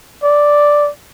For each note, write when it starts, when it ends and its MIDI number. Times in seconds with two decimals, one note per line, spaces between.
0.23 0.90 74